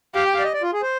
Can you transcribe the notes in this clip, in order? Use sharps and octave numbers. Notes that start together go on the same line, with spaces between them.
G4 F5
G5
F5
D5
D#5
D5
F4
G#4
C5